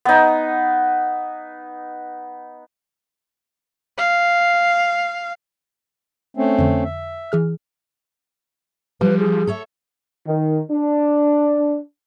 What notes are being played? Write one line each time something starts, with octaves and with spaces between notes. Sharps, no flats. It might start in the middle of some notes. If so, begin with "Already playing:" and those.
B3 D#4
F5
A3 C4 C#4
F2 D3
E5
E3 G#4 F6
F3 G3 B4
G#4
A4 C#5 E5
D#3
D4